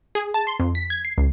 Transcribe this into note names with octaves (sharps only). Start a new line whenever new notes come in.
G#4
A5
C6
F2
B6
G#6
C7
C#2